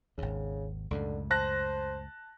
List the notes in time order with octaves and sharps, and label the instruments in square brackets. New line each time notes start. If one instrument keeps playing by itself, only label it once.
[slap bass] G#1 D#2 [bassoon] C#3
[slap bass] C#2 F#2 A2 [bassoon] D3
[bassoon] C5 [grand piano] A5 F#6 A#6